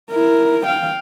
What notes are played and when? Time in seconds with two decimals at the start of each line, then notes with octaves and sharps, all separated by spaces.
0.11 E4 A#4
0.66 F5 G5